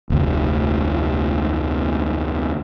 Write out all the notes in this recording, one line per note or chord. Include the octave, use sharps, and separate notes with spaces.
F1 D2